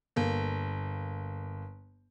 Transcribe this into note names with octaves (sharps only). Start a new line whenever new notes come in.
G1 A#3